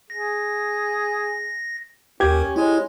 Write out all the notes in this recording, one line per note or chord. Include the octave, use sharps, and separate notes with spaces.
G#4 A#6
D#2 C#4 G4 A#4 G#6
G#3 E4 C#5